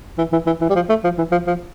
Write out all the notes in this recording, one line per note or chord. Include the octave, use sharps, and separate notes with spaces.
E3
E3
E3
E3
G3
F3
A3
F3
E3
F3
F3